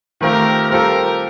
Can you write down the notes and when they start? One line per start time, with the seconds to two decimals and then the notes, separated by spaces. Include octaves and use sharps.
0.21 D#3 A3 C4 F4 G4 A#4
0.70 G3 C4 F4 G4 A4 A#4